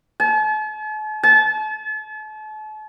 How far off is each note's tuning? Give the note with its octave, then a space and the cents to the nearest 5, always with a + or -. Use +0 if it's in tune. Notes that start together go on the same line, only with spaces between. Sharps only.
A5 -45
A5 -40